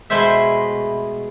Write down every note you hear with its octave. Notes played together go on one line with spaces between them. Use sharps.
B2 G#3 A3 E4 C5 E5